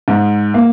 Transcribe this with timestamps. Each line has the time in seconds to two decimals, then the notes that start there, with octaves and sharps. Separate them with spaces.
0.08 G#2
0.54 A#3